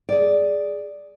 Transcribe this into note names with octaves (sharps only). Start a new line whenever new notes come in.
G#4 D5